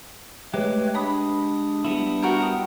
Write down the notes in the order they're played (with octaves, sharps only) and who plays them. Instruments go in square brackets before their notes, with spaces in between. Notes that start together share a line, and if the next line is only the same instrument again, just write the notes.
[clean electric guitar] G#3 G4 [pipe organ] A3 B4 C#5
[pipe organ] D4 D#6 [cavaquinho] B5
[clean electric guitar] G3 B3 E4
[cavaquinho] F#4 A#4 G5